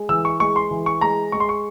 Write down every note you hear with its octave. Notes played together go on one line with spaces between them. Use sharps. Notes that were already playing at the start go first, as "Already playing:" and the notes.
Already playing: G#3
E3 E6
C#6
G#3 C#6
C6
E3
C#6
G#3 A#5
G#3 C#6
C6
C#6